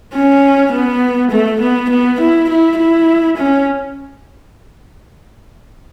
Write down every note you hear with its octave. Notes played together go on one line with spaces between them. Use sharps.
C#4
B3
A3
B3
B3
E4
E4
E4
C#4